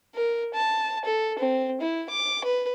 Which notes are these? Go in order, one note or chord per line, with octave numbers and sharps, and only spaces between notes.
A#4
A5
A4
C4
E4
D6
B4